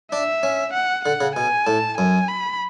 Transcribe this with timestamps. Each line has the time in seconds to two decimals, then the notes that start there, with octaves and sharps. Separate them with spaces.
0.12 D4 E5
0.43 C#4
0.74 F#5
1.05 D3 F#5
1.21 C#3
1.36 B2 G#5
1.66 A2 A5
1.98 F#2 G#5
2.29 B5